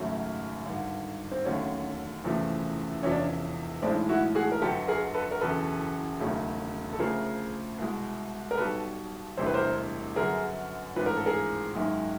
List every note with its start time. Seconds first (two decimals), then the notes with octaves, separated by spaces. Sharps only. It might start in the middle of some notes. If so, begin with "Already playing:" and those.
Already playing: G#1 F#2 C#3 F#3 A3
0.66 G#1 G2 D3
1.32 C4
1.44 E1 D#2 D3 F#3 A3 C#4
2.24 F#1 E2 C3 F3 A3
3.03 E1 E2 C3 F3 C#4
3.11 D4
3.19 C#4
3.82 B1 A2 E3 G#3 C4 D4
4.09 E4 F#4
4.35 F#4 G#4
4.52 A#4
4.62 G1 F2 D3 F#3 G4 A4
4.88 G#4 A#4
5.14 A4 B4
5.31 A#4
5.41 F#1 E2 B2 A4 B4
6.20 E1 D#2 C#3 F#3 A3
6.93 A4
6.99 D2 C#3 F3 A3 G#4 A#4
7.78 C2 B2 G#3
8.51 A#4
8.57 B1 B2 G3 A4 B4
9.37 E1 D2 C3 E3 G3 C5
9.46 B4
9.54 A#4 C5
10.16 G1 F#2 D3 F#3 G#4 A#4
10.96 A1 G#2 F3 B4
11.06 A#4
11.16 A4
11.26 G#4 A#4
11.75 G#1 F#2 D#3 G#3